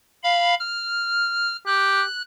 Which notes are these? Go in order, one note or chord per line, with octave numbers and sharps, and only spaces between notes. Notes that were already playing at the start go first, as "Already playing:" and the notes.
F5 B5
F6
G4 F#6